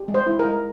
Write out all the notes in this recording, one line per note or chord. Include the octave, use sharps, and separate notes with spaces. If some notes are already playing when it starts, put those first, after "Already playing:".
Already playing: G4
G#3
C5
E4
A#4
G#3